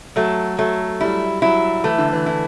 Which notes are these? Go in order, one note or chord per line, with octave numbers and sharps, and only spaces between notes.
F#3 A3
F#3 A3
G3 E4
F#3 E4
E3 A3
D3
E3
E3 E4